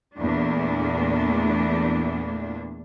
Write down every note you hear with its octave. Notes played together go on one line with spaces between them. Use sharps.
E2 A#2 A3 D4